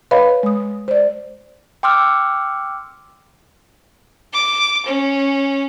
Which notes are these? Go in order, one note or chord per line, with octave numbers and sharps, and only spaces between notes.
B4 C#5 D#5 F5 B5
G#3 D#6
C5 D5
G5 C6 D6 E6 F6
D6
C#4